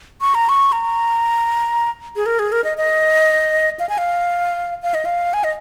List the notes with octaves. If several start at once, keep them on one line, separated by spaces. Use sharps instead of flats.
C#6
A#5
C#6
A#5
G#4
A#4
G#4
A#4
D#5
D#5
F5
G#5
F5
F5
D#5
F5
G#5
D#5